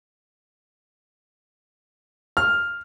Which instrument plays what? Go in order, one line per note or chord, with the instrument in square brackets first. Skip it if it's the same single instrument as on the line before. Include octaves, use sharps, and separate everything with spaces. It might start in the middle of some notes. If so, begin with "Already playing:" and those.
[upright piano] F6